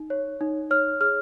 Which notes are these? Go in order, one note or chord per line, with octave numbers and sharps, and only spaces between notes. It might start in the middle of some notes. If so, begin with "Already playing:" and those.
Already playing: D#4
C#5
D#4
C#5 F6
G#4 F6